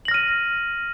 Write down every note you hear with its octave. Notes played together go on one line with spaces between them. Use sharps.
F6 A#6 D#7 F#7